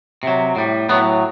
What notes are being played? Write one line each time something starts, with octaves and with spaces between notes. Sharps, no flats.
C3 F#3
A2 G3
A2 F#3 B3